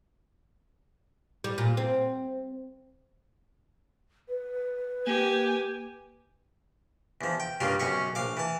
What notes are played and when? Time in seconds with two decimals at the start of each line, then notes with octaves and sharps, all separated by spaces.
1.44 G3
1.58 A#2
1.77 C4
4.29 B4
5.07 A#3 G4 G#5
7.21 E2 F3
7.40 G5
7.60 G2 C#3 A#3 F4
7.79 B1 F#2 C#4 G#4 C#6
8.15 A#1 F5 D6
8.37 E3 A5